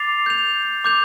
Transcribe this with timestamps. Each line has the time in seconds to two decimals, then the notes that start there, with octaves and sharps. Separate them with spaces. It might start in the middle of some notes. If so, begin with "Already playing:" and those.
Already playing: D6 A6 C7 F7
0.26 G6 F7
0.84 D6 G6 F7